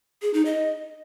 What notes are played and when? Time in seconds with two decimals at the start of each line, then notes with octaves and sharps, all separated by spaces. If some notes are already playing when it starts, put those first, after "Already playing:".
0.22 G#4
0.34 D#4
0.45 D#5